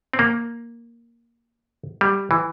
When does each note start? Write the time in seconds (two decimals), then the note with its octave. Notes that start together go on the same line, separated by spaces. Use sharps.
0.14 C4
0.19 A#3
2.01 G3
2.31 E3